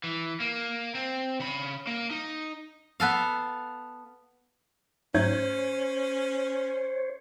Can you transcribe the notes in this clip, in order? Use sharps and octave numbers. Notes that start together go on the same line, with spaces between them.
E3
A#3
C4
C#3 B5
A#3
D#4
B3 A4 F5
G#2 F#3 A3 C#4 C5 C#5